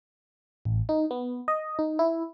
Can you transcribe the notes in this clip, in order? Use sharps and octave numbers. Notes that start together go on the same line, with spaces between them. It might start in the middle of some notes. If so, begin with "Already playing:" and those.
A1
D#4
B3
D#5
D#4
E4